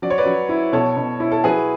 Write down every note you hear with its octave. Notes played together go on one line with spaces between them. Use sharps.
F#3 D5
C#5
B4 D5
F#3
E4
B2 A4 C#5
B2
E4
A4
F#3 G#4 B4